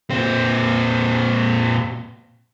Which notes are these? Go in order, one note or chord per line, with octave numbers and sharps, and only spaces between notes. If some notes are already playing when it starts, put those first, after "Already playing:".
A#2 C4